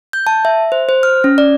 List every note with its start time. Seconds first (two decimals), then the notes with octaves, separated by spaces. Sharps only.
0.13 G6
0.27 A5
0.45 E5
0.72 C5
0.89 C5
1.03 F6
1.24 C#4
1.38 D5